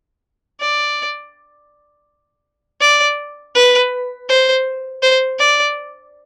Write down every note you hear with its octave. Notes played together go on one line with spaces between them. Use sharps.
D5
D5
B4
C5
C5
D5